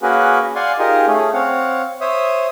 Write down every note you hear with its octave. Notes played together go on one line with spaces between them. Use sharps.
A#3 C#4 F#4 G#4 A#4 B4
D5 F5 F#5 G#5 C6
D#4 F4 G4 G#4 A#4 D#5
A3 C#4 G#4
C4 C#5 F5 F#5
C5 C#5 E5 D#6